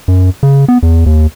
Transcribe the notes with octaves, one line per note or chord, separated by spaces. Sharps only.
F#2
C#3
B3
E2
D#2